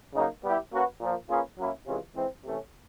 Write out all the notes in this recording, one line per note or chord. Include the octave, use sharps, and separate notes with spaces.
C#3 F#3 A#3 D#4
G3 B3 E4 G4
A#3 C#4 F#4 B4
A#2 F3 A#3
A#3 C#4 F4 G#4 B4
F#3 A#3 C#4 E4
C3 E3 G#3 C#4 F4
E3 G#3 C4
C3 E3 A3 C#4